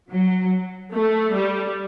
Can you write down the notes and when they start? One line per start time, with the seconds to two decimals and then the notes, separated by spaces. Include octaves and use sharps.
0.11 F#3
0.92 A3
1.33 G3